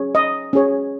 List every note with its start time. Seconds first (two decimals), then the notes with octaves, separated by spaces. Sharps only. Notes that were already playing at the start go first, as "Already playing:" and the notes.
Already playing: C#4 G#4 C#5
0.15 D#5
0.53 C#4 G#4 C#5